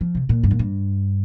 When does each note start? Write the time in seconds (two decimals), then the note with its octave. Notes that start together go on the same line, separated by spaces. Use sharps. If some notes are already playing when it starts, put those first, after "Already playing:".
0.01 F3
0.15 C3
0.29 A#2
0.44 G2
0.51 A#2
0.59 G2